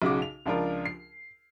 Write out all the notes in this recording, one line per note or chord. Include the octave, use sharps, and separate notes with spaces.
B1 C#3 F#4 D6
F7
C#2 F3 D4 F4 A#4
C7